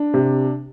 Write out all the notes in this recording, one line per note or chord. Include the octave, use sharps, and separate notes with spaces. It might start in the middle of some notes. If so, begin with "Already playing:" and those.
Already playing: D4
C3